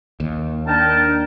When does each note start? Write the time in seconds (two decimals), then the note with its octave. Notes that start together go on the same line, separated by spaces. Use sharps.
0.20 D#2
0.67 D4 A#4 G5 A5